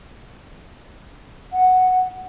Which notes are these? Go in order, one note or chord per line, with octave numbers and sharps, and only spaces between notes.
F#5